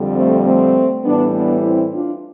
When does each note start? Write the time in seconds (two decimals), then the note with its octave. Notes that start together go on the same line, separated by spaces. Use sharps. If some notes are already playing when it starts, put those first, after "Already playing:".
Already playing: F2 D3 G3
0.16 A3 C4
0.45 A3 C4
1.04 A2 E3 G3 B3 D4
1.33 B3 D4
1.63 C4 E4
1.92 D4 F4